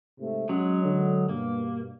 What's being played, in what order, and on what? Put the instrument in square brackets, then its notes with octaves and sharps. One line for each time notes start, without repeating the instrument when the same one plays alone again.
[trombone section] G#2 C3 A3
[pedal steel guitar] F#3 G#3 [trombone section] C#4
[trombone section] D3
[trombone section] G2 B2 [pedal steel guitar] A#3